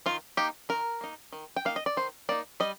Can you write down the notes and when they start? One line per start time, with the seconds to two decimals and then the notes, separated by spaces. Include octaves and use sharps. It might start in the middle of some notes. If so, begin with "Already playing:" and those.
0.06 D#3 F4
0.37 A#3 D#4 G4
0.69 D#3 A#4
1.01 A#3 D#4
1.33 D#3
1.56 G5
1.65 A#3 D#4 F5
1.76 D#5
1.86 D5
1.97 D#3 C5
2.29 A#3 D#4 D5
2.60 G3 D#5